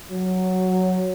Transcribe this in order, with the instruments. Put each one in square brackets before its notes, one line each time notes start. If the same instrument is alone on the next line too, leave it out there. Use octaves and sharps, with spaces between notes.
[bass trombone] F#3